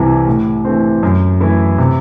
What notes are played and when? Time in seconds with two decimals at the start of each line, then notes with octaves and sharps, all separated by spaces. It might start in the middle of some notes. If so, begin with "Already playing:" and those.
Already playing: C2 C3 E3
0.27 A2
0.65 E3 A3 C4
1.03 F#2
1.40 E3 A3 E4
1.78 C3